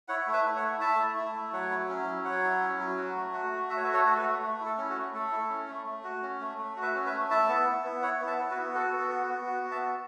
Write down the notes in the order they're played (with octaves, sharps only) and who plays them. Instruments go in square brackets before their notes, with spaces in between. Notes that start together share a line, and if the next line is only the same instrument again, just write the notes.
[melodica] E4 C#5 F#5
A3
B4 E5
E4
C#5 F#5
A3
E4 E5 A5
A3
E4
A3
F#3 C#5 F#5
E4
C#4
F#3
F#3 C#5 F#5
E4
C#4
F#3
F#4
A3
F#4
A3
F#4 E5
C#5
B4 E5
A3
A4 C#5
F#4
A4
F#4 B4
A3
A3
E4
A4
C#4
F#4
A3
A3 A4
E4
C#4
A3
A3
F#4
C#4
A3
A3
F#4
B4 E5
C#4
B4 E5
A3
E4 E5 A5
B3
E4
B3
E4 C#5 F#5
B3
E5 A5
E4
F#4 B4
B3
F#4 A4
B3
A4
F#4
F#4
B3
F#4
B3
E5 A5
F#4